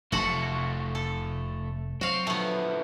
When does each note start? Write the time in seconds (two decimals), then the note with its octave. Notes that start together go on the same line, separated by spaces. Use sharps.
0.12 F1 C3 A3 F4 F#4 A4 F#5
0.95 A4
2.01 F#3 C4 F#4 F5
2.27 D3 F3 A3 B3